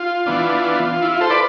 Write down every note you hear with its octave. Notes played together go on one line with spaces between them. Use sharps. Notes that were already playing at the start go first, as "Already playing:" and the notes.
Already playing: F4
E3 B3 D4
E4
F4
A4 C5
B4 D5